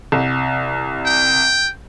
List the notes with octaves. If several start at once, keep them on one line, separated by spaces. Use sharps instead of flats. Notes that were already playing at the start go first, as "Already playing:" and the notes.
C2
G5